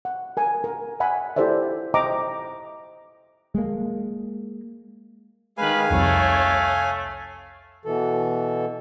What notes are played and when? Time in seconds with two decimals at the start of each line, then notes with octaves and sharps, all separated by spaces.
0.05 F#5
0.37 A#4 G#5
0.64 A#4
1.00 E5 F#5 G#5 B5
1.36 E4 G4 A4 C5 D5 E5
1.94 C5 D#5 E5 G5 A#5 D6
3.55 G#3 A#3
5.58 D#3 G#3 B4 F5 G#5
5.90 C2 F2 A3 C#5
7.85 B2 E3 A4